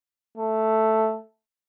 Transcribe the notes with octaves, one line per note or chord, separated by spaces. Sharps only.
A3